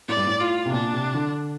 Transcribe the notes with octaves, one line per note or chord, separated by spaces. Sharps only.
A2 D5
G2
A2
F4
C3
A#2 D4
C3
D3